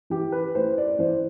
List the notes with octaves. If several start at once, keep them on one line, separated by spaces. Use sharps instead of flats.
E3 G4
B4
A3 E4 C5
D5
E3 C5